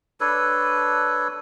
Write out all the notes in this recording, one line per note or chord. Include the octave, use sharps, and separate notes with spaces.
D4 A4 B4 C#5